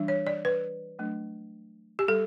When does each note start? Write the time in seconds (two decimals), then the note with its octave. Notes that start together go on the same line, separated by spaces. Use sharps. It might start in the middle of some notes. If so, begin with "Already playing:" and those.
Already playing: E3 G3 D4
0.08 C#5
0.27 D5
0.45 B4
0.99 F#3 A3 D4
1.99 G4
2.08 G3 A4